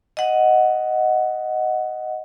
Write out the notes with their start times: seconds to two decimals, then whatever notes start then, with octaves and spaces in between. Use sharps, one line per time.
0.17 D#5 F#5